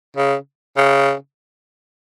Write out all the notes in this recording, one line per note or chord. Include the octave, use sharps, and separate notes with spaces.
C#3
C#3